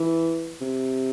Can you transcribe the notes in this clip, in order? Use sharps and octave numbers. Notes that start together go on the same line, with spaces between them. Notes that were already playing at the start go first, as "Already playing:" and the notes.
Already playing: E3
C3